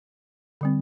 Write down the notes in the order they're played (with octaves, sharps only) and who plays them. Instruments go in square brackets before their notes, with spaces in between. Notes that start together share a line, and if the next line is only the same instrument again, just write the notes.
[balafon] D3 G3 C4